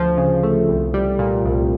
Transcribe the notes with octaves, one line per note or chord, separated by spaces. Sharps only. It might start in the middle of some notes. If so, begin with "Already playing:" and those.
Already playing: D2 F3
C#3
A3
C2
G3
A#2
C2